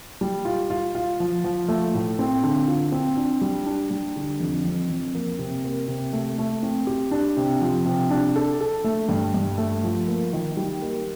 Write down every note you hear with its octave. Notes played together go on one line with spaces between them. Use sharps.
G3
F4
F4
F4
F3
F3
A3
A2
C4
D3
F4
C4
D4
G3
D4
G3
D3
F2
F2
F2
A#3
C3
A#3
C3
A3
A3
C4
G4
D4
C3
F3
C3
D4
A4
A4
A3
G2
G2
A3
F3
A#3
D#3
G3
A#3